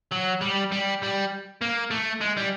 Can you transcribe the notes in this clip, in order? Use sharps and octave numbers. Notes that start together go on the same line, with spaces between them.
F#3
G3
G3
G3
A#3
A3
G#3
G3